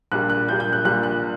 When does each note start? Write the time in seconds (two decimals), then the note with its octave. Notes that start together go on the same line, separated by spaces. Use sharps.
0.12 A#1 A#2 G3 F#6
0.30 F#6
0.49 A#1 A#2 G3 G6
0.60 G6
0.73 F#6
0.85 A#1 A#2 G3 F#6
1.03 F#6